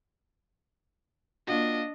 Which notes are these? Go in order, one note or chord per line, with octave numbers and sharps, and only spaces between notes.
A#3 D4 F4 F#4 D#5